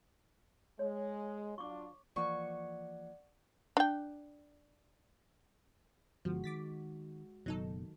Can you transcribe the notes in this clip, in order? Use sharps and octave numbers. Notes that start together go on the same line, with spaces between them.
G#3 C#5
F#3 D4 F4 C#6 D6
E3 F3 A#3 D5 F#5 C#6
D4 G5
G1 D3 F3 G#3 B3 F#4
D#3 D6 A6 B6
F#1 B2 D#3 F#3 D#4 A4